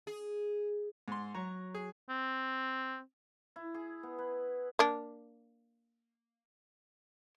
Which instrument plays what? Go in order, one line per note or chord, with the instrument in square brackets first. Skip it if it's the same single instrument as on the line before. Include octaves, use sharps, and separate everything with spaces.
[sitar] G#4
[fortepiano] G#2 C6
[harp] F#3 C#5 [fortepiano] A#5
[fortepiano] G#4
[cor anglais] C4
[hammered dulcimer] E4
G#4
B3
B4
[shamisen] A#3 D4